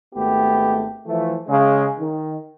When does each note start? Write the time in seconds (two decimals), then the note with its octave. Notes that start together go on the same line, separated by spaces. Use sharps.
0.15 G#1 A3 B3 G4
1.06 E3 F3 A3
1.47 C#3 G#3
1.98 D#3